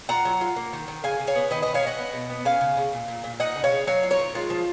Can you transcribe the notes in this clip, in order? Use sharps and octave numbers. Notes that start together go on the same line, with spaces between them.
F4 F#5 A#5
F#3
F4
A#3
D#3
D#3
C#3 F5 G#5
C#3
C#5 F5
B3
D#3 B4 D#5
D#3 B4 D#5
C#5 F5
C#4 D#5 F#5
B3
B2
B3
C#4 F5 G#5
C#3
C#3
A#2
A#2
A#2
D#4 D#5 F#5
C#3
C#5 F5
C#3
F#3 C#5 F5
F4
A#4 C#5
D#3
G#3 F4
F3